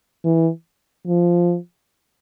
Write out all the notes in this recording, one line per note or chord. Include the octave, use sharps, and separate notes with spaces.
E3
F3